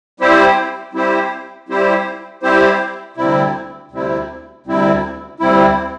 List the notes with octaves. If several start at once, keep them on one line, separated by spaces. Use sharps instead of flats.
G3 C4 E4 G4 C5
G3 C4 E4 G4 C5
G3 C4 E4 G4 C5
G3 C4 E4 G4 C5
D2 C3 G3 C4 E4
D2 C3 G3 C4 E4
D2 C3 G3 C4 E4
D2 C3 G3 C4 E4